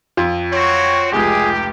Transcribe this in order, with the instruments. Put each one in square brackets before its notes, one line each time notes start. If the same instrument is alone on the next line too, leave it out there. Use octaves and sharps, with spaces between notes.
[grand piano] F2 [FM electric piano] F4
[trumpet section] C4 F#4 [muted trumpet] C#5
[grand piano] F1 C#2 [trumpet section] G4 [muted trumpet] G#4